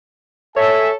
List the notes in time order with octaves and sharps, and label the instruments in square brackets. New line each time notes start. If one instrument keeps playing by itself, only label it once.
[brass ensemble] A4 [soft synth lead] C#5 [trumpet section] E5 G#5